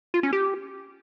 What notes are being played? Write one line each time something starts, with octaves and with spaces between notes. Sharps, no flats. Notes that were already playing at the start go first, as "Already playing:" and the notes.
F4
C#4
G4